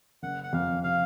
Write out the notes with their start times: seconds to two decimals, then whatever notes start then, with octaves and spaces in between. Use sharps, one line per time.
0.23 F#1 F#5
0.44 F#5
0.53 F2 F5
0.83 C3 F5